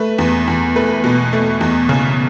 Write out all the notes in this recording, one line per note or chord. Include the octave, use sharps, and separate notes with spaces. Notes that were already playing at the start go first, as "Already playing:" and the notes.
Already playing: A3 B4
E2
E2
A3 B4
B2
A3
E2
C#3